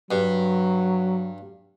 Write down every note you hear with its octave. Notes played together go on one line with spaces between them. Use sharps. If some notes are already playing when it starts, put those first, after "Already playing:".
G2 F#3